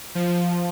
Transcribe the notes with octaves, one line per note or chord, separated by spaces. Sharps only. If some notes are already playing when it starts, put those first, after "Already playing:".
F3